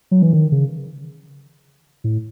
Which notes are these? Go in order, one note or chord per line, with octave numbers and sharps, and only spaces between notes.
F#3
E3
D#3
C#3
A2